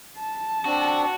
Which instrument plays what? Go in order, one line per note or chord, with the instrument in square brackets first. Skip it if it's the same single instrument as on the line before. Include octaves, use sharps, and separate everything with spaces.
[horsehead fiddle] A5
[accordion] C4 D4 [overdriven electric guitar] F#4